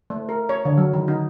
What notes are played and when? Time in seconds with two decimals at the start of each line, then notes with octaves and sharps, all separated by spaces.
0.10 A3
0.29 A#4
0.49 C#5
0.65 D3
0.78 F#3
0.93 D#3
1.08 D#4